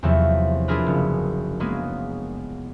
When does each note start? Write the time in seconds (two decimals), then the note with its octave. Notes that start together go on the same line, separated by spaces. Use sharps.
0.03 E2 C3 F3 F#3 A3
0.68 D4 E4 F4 G#4 A#4 B4
0.86 F#1
1.60 F#3 G#3 A#3 B3 G#4